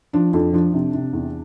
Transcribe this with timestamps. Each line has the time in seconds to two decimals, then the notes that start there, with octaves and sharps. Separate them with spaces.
0.13 F3 D4
0.33 F2 D4
0.53 F3 D4
0.73 C3
0.94 C3
1.13 E2